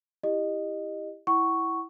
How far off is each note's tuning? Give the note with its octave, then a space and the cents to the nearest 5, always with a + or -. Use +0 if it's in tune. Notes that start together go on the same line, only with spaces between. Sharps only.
E4 +0 G4 +20 D#5 -15
E4 +0 F#5 +25 C#6 +0